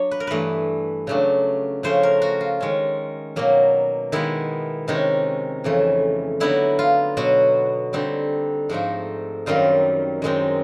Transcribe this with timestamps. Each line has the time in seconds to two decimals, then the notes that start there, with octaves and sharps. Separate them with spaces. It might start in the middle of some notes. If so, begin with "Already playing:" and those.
Already playing: F#3 D4 C#5
0.11 B4
0.20 A#4
0.27 G2 E3 A3 B4
1.07 C#3 F#3 A3 D4
1.83 C#3 F3 A3 C#4 C5
2.03 A#4
2.22 F#4
2.41 F4
2.60 D#3 G#3 C#4
3.36 B2 F#3 A#3
4.12 D#3 G#3 B3 E4
4.88 C3 D#3 G#3 C#4 D#4
5.64 F2 C#3 E3 A3
6.40 D3 F#3 B3 D#4 E4
6.79 F4
7.17 B2 F#3 B3 F#4
7.93 D3 G3 C4 D#4
8.70 G#2 F3 A3 C4 D#4
9.46 F#2 D#3 G3 C4 D#4 F4
10.22 F#2 D#3 G#3 C4 D#4